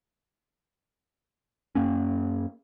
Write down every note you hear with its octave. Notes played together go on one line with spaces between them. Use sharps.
F#2 A#3 C#4